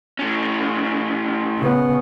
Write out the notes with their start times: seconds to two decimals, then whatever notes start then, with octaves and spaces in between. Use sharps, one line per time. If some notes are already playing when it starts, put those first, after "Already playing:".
0.19 A2 C#4
1.60 C#3 B3